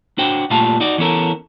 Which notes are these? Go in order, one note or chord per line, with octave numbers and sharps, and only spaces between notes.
D4 F#4 C5 G5
A#2 G3 A3 F4 F5 A5
D#4 F#4 D5
E3 B3 C#4 A4 A#4